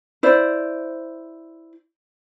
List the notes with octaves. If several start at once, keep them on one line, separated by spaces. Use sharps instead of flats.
E4 C5 D5